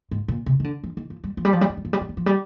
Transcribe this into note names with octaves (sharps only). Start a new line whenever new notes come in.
G#2
A#2
C3
D#3
D3
F3
D#3
F3
G3
F3
G3
F3
G3
F3
G3
F3
G3
F3
G3
F3
G3